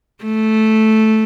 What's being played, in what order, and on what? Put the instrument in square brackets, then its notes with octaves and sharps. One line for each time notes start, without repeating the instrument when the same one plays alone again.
[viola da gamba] A3